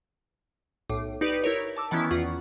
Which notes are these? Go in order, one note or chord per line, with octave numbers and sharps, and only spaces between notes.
B1 A2 D6
D#4 G4 B4 D5
E4 A#4 C#5
A5 D6 E6
D#3 E3 B3 C#4 E4
E2 F4 F#5 C#6